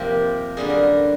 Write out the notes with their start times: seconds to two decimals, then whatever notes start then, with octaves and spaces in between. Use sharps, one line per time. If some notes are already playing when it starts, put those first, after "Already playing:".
Already playing: C3 F3 A#3 G4
0.57 F#2 D3 G3 A#3 G#4
0.70 A#4